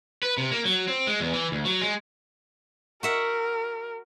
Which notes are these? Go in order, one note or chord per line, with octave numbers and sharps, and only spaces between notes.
B4
C3
A#3
F#3
C4
G#3
E2
E3
D2
F#3
G#3
F#4 A#4 E5 F#5